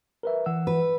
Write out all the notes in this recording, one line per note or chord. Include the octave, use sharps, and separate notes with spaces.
A#4 B4 E5
E3 F#5 E6
B4